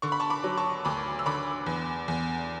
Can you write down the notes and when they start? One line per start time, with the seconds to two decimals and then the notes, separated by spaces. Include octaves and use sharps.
0.02 D3 C#6
0.12 B5
0.20 A5 C#6
0.30 B5 D6
0.44 F#3
0.57 A5 C#6
0.85 D2 B5 D6
1.19 E6
1.26 D3 B5 D6
1.66 E2
2.08 E2